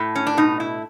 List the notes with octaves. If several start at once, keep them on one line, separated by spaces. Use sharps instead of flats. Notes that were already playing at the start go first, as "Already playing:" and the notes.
Already playing: A2
C#4
D4
B2 D#4
E4